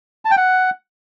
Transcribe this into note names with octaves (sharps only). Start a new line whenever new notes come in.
A5
G5
F#5